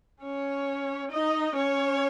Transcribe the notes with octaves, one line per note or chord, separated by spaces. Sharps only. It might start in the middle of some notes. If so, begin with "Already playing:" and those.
C#4 C#5
D#4 D#5
C#4 C#5